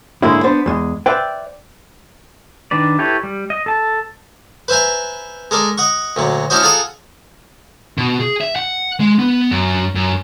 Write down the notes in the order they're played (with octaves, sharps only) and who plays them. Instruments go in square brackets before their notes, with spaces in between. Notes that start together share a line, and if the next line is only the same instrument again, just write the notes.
[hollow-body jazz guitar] G#2 D3 G#3 A#3 C#4 E4
B3 D4 C5
E2 G#3
B4 C5 D5 E5 G5
[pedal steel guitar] D#3 D4 B4 D5
E4 G4 A4 B4 C#5
G3
D#5
A4 A5
[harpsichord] B4 C5 E5 G#5 A#5
G#3 A4 A#4 D5
D#5 F#5 C#6
D2 A#2 F#3
C#4 D4 E4 F#4 C5 D#5
F4 G#4 A4 F#5 A#5 D#6
[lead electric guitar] B2
G#4
E5
F#5
G#3
B3
F#2
F#2